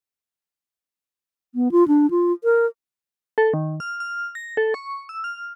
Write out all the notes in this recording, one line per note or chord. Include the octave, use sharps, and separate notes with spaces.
B3
F4
D4
F4
A#4
A4
D#3
F6
F6
A#6
A4
C#6
E6
F6